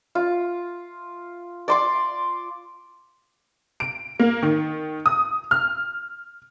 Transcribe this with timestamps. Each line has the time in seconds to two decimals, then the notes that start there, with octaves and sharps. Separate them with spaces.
0.15 F4
1.68 D5 C6 D6
3.80 D7
4.20 A#3
4.43 D#3
5.06 D#6
5.51 F6